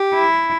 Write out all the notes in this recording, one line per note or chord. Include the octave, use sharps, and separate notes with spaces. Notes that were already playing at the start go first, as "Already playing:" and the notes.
Already playing: G4
E4